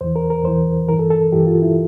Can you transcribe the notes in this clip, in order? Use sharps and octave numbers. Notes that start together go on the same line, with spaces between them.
E2 E3 C5
A#4
A#4
E2 E3 C5
G2 E3 A#4
A4
A4
G2 E3 G4
F4
E4